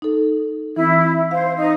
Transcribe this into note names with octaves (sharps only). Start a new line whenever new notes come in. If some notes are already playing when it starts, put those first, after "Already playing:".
D#4 A4
E3 C4 E4
C5 F5
D#4